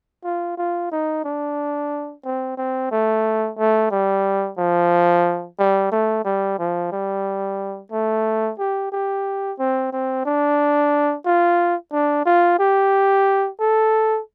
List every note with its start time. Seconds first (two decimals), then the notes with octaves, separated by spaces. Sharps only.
0.24 F4
0.57 F4
0.91 D#4
1.24 D4
2.25 C4
2.57 C4
2.91 A3
3.58 A3
3.91 G3
4.58 F3
5.59 G3
5.92 A3
6.25 G3
6.59 F3
6.92 G3
7.92 A3
8.59 G4
8.92 G4
9.59 C4
9.92 C4
10.25 D4
11.25 F4
11.92 D4
12.26 F4
12.59 G4
13.60 A4